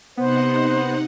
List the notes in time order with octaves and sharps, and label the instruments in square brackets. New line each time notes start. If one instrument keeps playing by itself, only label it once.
[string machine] C3 D#4 F#5 [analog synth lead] B3 [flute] C5